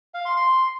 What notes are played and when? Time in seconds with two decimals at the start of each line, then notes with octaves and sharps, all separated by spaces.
0.14 F5
0.25 C6
0.36 C6